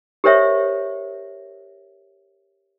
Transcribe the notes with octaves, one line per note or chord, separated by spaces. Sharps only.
G4 A#4 C5 C#5 E5